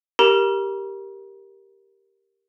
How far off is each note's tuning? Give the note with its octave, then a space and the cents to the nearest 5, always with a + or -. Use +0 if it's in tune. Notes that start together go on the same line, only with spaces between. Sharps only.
G4 +0 A#4 +0 A#5 +45